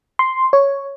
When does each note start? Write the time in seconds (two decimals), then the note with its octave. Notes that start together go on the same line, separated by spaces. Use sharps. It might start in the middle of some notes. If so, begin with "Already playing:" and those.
0.19 C6
0.53 C#5